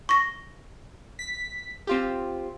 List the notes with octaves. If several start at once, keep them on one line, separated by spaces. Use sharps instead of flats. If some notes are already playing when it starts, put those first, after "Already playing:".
C#6 A#6
B6
C4 F4 G4